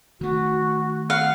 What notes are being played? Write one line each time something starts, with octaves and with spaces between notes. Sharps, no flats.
D#3 A3 F#4
F5 F#5